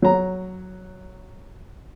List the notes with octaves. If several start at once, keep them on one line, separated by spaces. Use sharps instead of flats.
F#3 A#5